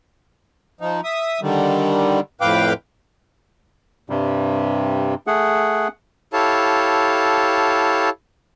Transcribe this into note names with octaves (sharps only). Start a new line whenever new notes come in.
F3 D#4
E5 D#6
D3 D#3 G3
F2 A2 B4 F5 G5 D6
G2 C3 G3
A3 G#4 F#5
E4 G4 A4 C#5 F5 A5